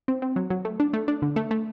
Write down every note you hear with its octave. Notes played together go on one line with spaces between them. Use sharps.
C4
C4
F#3
F#3
A3
D4
A3
D4
D3
A3
A3